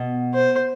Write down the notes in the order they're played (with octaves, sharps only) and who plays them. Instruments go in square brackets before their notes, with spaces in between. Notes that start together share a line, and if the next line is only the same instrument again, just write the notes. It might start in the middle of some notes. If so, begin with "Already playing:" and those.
Already playing: [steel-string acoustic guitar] B2
[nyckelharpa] C5